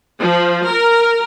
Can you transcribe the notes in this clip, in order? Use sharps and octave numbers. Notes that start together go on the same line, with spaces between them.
F3
A#4